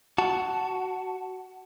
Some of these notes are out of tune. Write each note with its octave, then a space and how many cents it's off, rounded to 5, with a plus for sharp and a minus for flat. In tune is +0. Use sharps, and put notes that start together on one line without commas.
F#4 +10 A5 +0